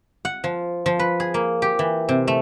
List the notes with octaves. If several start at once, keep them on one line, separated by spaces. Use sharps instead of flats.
F#5
F3
F3
B4
G#4
A#3
G4
E3
C3
A3